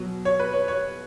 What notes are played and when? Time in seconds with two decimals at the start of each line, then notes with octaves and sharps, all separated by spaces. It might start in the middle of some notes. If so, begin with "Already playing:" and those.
Already playing: B2 F#3
0.25 C#5
0.39 B4
0.53 C#5
0.68 C#5